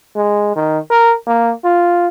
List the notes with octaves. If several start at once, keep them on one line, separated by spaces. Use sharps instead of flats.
G#3
D#3
A#4
A#3
F4